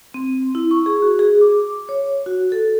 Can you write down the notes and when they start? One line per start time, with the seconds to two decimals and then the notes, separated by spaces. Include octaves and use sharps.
0.14 C4
0.55 E4
0.71 C#6
0.86 G#4
1.02 F#4
1.19 G#4
1.41 D6
1.89 C#5
2.26 F#4
2.52 A4